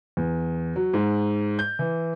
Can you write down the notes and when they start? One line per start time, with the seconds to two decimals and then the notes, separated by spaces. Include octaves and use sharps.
0.17 E2
0.76 F#3
0.94 G#2
1.59 G6
1.79 E3